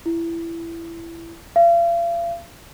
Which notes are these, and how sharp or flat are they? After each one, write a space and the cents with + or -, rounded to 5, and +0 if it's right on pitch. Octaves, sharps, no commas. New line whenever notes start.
E4 +20
F5 -40